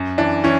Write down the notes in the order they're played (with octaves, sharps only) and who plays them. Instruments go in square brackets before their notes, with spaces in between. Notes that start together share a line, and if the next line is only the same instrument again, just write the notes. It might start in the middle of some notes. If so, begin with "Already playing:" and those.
Already playing: [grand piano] F#2
E3 D4
E3 C#4